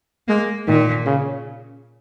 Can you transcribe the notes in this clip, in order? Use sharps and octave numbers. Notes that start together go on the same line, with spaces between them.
G#3 A#3
A#2 D#3
C#3